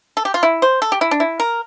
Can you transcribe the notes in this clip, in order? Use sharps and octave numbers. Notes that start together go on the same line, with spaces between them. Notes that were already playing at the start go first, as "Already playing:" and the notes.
A4
G4
F4
E4
C5
A4
G4
E4
D4
E4
A#4